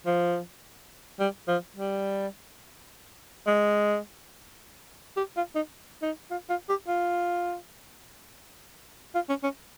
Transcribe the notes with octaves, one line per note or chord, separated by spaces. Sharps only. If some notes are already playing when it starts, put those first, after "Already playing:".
F3
G3
F3
G3
G#3
G4
F4
D#4
D#4
F4
F4
G4
F4
F4
C#4
C#4